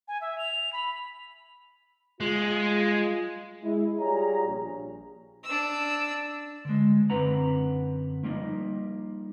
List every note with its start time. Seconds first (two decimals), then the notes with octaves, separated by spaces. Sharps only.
0.08 G#5
0.21 E5
0.38 F7
0.73 B5
2.21 G#3 F4
3.63 G#3 E4
4.00 G3 F4 G#4 C#5 A#5
4.47 A#1
5.44 D4 E6
6.65 D3 G#3
7.10 F#2 D3 C4 B4 F#5 A#5
8.23 F3 G3 A#3 D#4